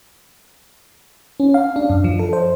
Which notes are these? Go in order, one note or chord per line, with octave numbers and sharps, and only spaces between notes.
C#4
F5
D4
F#2
F3
A4
C5